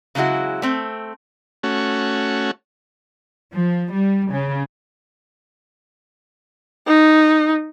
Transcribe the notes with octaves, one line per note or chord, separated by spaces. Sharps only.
C#3 F#3 G#3 E4 F#4
A3 C4
A3 C#4 F#4
F3
G3
C#3
D#4